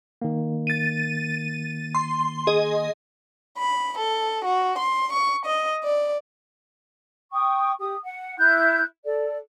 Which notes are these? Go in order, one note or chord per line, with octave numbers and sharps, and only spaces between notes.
D#3 A#3
A6 D#7
C6
G#4 D#5
B5
A4
F#4
C6
C#6
D#5
D5
G5 C#6 D#6
G4 D#6
F#5
E4 F#6 G6
A4 D5